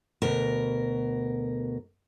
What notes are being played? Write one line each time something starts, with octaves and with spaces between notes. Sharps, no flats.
D2 B2 A#4